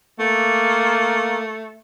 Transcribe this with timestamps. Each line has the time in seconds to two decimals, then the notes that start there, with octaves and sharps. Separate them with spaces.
0.20 A3 A#3